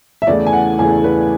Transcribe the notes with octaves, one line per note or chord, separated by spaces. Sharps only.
E5
E2 C#3 E3 A3 D5
G#5
F#5
E2 C#3 E3 A3 G#5
B4